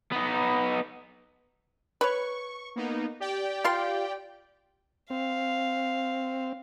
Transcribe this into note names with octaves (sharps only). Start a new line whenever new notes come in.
B3 D#4
B4 C#5 C#6
A#3 B3 D#4
G4 D5 G5
F4 F5 C6
C4 F5